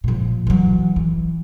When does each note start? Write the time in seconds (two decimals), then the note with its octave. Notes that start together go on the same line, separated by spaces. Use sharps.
0.04 A#2 F3
0.47 E3 F#3
0.96 E3